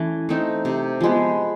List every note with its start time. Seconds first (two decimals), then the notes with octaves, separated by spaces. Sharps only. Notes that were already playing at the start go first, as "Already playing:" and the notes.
Already playing: E3 A3 C#4
0.29 A3 C4 D#4
0.65 C3
1.01 F3 G#3 B3